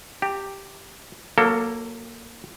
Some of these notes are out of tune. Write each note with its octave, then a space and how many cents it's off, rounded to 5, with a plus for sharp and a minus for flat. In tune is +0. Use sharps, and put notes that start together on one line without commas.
G4 +0 A#5 -40
F#3 -5 A#3 +0 A4 +25